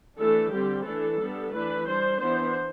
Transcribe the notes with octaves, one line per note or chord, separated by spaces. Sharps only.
E3 A3 D4 A4
D3 G3 C4 G4
E3 A3 D4 A4
G3 B3 D4
E3 A3 D4 B4
G3 D4 C5
E3 B3 D4 C5